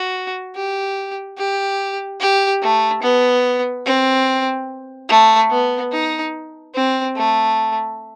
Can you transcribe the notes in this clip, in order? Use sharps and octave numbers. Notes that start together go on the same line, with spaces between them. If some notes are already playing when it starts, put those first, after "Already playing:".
Already playing: F#4
G4
G4
G4
A3
B3
C4
A3
B3
D#4
C4
A3